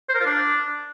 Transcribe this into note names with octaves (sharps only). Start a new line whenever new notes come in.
C5
A#4
F4
D4